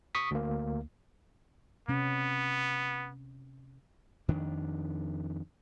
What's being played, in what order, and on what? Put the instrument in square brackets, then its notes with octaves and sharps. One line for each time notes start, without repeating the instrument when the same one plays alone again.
[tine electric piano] C#6 D#6 B6
D2 A#3
[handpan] C3 C#4 [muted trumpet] B3
[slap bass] F2 D#3 D4